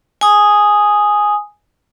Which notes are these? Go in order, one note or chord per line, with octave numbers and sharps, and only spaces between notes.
G#5 D#6